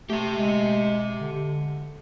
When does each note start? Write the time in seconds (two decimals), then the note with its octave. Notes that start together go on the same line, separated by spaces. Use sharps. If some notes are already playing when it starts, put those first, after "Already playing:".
0.10 A3 G4 E5
0.38 G#3
1.20 D3